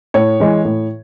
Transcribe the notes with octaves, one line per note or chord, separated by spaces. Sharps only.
A2 C#5
E3 G#3
A2